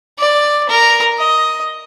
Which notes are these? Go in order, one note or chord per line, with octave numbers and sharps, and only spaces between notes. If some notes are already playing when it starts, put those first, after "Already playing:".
D5
A#4
D#5